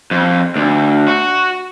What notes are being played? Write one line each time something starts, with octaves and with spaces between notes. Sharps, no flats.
F2
D2
F#4